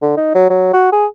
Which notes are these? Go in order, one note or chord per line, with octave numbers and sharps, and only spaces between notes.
D3
D#4
F#3
F#3
F#4
G#4